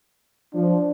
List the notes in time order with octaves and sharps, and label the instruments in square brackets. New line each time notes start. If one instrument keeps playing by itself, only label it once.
[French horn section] F3 [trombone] D4